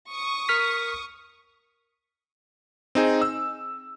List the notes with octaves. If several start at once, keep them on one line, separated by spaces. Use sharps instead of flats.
C#6 D#6
A#4 F6 B6
C4 D#4 G#4
E6